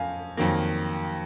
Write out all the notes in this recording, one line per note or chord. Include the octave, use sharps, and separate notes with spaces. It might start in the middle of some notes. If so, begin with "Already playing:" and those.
Already playing: F2 F3 C#4 F5 G#5
F2 D#3 F#3 A#3